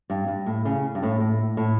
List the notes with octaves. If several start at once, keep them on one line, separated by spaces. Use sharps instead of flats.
G2
G2
A2
C#3
G2
A2
A2
A2